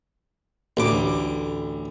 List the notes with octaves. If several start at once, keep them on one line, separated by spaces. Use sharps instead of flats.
A1 D2 D6